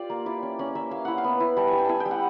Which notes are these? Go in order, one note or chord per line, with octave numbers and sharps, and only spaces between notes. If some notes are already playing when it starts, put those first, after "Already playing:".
Already playing: F4 G4 D5
A#3
E4 D5
C#4
C#4 D5
A#3 E5
A#3 F5
E4 F#5
F5
B3
E4
G3 A5
G3 G#5
G5
E4 G#5 A5
G5
G3
F#5